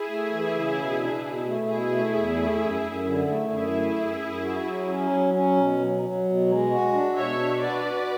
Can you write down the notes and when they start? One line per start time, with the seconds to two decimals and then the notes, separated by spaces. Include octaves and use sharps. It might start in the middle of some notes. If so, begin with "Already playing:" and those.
Already playing: E4 G#4
0.08 A3
0.32 E3
0.54 C#3
0.77 B2
0.99 D4
1.23 B2
1.45 A3
1.68 B2 E4 G#4
1.91 A3
2.14 E2
2.37 A3
2.60 F#2
2.83 F#2
3.05 D3
3.28 A3
3.50 F#2 E4 G#4
3.74 A3
3.96 F#2
4.19 F#2
4.42 F#4
4.65 F#3
4.88 C#4
5.10 F#3
5.34 C#4
5.57 B2
5.79 F#3
6.02 F#3
6.25 B2
6.48 G#3
6.71 F#4
6.93 D4
7.15 B2 C#5 E5
7.39 D4
7.61 F#4 B4 D5
7.85 F#4